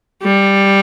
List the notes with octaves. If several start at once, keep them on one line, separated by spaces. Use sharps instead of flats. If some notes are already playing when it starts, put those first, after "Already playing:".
G3